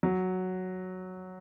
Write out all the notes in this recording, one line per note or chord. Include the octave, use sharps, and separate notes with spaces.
F#3